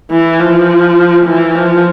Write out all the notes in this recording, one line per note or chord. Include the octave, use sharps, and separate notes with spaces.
E3
F3
E3
F3